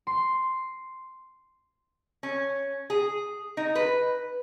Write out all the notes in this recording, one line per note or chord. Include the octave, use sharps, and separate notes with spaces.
C6
C#4
G#4
D#4
B4